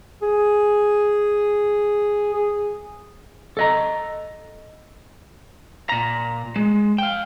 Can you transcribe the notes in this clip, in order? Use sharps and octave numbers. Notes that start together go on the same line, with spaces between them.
G#4
G#4
A4 D#5 A#5
A#2 A#5
G#3
F5 G5